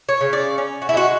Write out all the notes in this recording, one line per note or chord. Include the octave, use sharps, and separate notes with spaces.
C#5
C#3
D5
C#4
F#4
E4
G#3 F#4